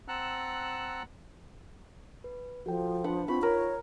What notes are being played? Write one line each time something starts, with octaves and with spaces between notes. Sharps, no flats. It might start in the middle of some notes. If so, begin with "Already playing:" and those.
C4 F#5 A5 A#5 E6 F#6
B4
F3 F#4 A4 G5
D4 B4 F#5 A5
C4 D#4 F4 B5 C#6
A#4 C#5